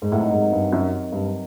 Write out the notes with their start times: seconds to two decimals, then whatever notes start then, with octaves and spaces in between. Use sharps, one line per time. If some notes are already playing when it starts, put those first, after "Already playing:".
0.02 G#2
0.12 A2 C3 D#3 F#3
0.31 G#2
0.52 G2
0.73 F#2
1.12 G2